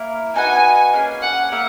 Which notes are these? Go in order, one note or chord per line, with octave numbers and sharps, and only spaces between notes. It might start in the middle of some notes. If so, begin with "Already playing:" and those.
Already playing: A#3 E4 A#4
D#4 F#4 B4 F#5 G#5
A#3 C#4 G#4
F#5
A#3 E4 A#4 E5